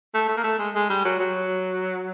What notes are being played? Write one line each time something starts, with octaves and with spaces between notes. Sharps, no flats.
A3
A3
A#3
A3
G#3
G#3
G3
F#3
F#3